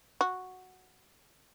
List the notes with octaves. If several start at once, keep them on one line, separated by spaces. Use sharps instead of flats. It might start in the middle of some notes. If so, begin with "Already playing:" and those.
F#4